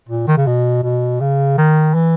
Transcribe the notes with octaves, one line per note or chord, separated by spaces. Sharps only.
A#2
D#3
C#3
B2
B2
C#3
D#3
E3